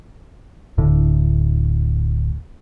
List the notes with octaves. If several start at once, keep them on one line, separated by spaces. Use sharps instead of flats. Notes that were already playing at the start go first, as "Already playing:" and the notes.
D1 A2 D3